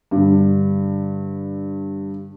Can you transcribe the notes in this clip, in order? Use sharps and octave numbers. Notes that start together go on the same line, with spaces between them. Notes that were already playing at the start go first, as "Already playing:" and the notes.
G2 D3